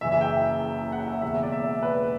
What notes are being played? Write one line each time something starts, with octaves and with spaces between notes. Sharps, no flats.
F#1 F#2 C#3 E3 E5
E5
G5
F#5
E5
E1 E2 C#3 E5
D5
E5
B4